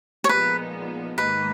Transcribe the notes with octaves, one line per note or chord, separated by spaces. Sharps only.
C#5
A#2 F3 G#3 B3 D#4 B4
G#2 D#3 A#3 D#4 B4